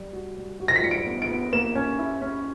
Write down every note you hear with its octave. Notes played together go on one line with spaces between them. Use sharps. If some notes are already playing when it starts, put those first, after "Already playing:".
Already playing: G3
F#4
G3
F#4
A#6
B6
G3 C#7
D7
B3
D7
B3
A#3 E7
C#4
E4
C#4